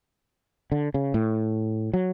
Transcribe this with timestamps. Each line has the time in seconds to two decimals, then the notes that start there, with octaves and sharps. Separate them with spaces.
0.72 D3
0.94 C#3
1.14 A2
1.93 F#3